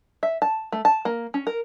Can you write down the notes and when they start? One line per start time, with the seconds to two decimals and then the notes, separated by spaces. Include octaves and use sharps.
0.23 E5
0.42 A5
0.72 A3
0.85 A5
1.05 A#3
1.34 C#4
1.47 A#4